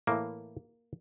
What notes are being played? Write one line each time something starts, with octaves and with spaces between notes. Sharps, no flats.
A2 E3 A#3